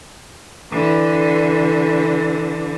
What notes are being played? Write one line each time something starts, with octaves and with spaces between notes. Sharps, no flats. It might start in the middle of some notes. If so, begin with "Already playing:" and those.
D3 E3